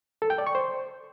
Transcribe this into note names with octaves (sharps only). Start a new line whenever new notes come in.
A4
G5
D5
C#6
C5